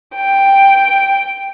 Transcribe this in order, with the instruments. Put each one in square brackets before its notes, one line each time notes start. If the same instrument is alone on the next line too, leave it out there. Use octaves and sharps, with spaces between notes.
[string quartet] G5